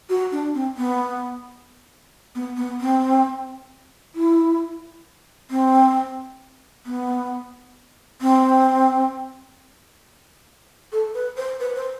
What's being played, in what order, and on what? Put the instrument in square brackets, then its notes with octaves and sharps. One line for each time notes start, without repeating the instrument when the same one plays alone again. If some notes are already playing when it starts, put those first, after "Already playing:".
[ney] F#4
D4
C4
B3
B3
B3
C4
E4
C4
B3
C4
A4
B4
C5
B4
C5